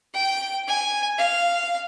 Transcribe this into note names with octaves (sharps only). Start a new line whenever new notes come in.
G5
G#5
F5